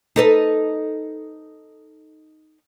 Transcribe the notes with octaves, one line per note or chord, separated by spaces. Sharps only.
D#4 A4 B4